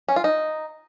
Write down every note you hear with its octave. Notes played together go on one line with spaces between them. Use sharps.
C#4
F4
D#4